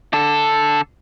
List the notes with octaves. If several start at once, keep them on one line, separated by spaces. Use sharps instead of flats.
D3 A4